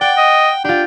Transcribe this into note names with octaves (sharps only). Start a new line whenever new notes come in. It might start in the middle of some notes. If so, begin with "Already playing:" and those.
D5 F#5 G5
D#5
D4 F4 G4 G5